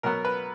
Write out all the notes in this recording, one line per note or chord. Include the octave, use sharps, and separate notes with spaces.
B2 F#3 B3 A#4
B4